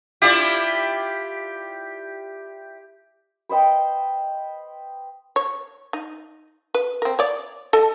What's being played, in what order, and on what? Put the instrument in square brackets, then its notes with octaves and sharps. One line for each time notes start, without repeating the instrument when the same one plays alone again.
[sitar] E4 F4 D5 [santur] G4
[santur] B4 C5 D#5 G5
[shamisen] C#5
D#4
B4
C4 A#4
C#5 D5
A4 D#5 A5